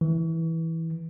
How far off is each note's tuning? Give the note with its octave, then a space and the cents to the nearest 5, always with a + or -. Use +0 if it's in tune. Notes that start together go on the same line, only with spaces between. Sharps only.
E3 -15